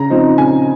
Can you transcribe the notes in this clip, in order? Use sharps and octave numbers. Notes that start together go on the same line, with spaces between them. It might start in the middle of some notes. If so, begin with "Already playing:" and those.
Already playing: C#3 A#5
F3 C4 D#4
C#3 G#5